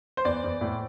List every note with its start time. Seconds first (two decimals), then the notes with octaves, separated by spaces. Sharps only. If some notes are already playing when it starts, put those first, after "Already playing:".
0.17 C5
0.25 E2 D5
0.44 E2
0.61 A2